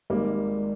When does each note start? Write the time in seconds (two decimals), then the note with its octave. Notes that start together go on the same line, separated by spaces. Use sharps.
0.10 G#1 G#2 G3 A#3